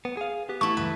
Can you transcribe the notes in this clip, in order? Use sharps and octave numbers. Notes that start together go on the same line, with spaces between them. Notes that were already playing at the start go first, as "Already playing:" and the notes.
B3
G#4 F5
B3 G4
A3 E4 C#6
C#2 G2 E3 B4